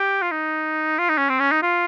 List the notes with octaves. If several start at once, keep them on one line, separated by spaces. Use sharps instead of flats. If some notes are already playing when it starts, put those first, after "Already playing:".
Already playing: G4
F4
D#4
F4
D#4
C#4
C4
C#4
D#4
F4